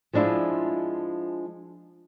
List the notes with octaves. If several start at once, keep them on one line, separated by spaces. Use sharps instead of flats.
F3 G#3 D4 E4 F4